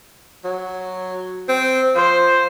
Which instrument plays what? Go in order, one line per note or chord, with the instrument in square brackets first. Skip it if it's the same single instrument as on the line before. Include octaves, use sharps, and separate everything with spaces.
[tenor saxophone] F#3
C4
[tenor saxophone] F3 [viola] C5